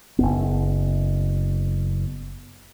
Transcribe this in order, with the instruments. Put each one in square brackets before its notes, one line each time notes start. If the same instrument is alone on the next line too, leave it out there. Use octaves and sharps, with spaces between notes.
[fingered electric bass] F#1 E2 B3